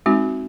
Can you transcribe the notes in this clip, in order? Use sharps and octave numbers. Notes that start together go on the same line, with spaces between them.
G#3 C4 D#4 F#4